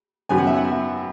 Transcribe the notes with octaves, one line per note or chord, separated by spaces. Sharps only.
F#2 D#3 F#3 B3 G#5
F#5
E5
F#5